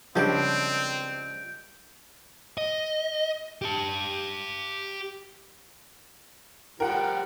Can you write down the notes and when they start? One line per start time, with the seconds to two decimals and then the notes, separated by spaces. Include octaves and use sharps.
0.16 C#2 F3 G3 C4 D4 C#5 G6 D7
2.58 D#5
3.62 G4 A5
6.80 F3 G3 A#4 F#5 G5